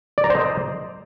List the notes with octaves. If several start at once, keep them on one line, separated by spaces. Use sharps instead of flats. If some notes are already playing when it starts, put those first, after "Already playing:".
D5
A#5
C5
D#5